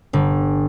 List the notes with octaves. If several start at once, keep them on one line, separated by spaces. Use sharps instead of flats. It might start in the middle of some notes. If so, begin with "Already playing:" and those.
G1